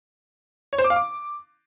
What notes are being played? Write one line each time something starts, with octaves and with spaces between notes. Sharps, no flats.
C#5
C5
D6
F5
D6